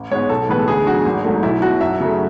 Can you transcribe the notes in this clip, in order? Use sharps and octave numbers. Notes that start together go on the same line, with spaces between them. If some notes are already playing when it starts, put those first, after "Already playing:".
Already playing: A1
G#2 G#3 B3 C#5
B1 A4
A2 E3 G#3 B3 B4
A4
D2 G#4
D3 F#3 F#4
G#1
G#2 F#3 A3
B1 E4
B2 F#3 F#4
F#2 E5
C#3 F#3 A3